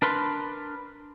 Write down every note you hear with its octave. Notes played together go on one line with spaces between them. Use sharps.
D4 A#4 B4 C6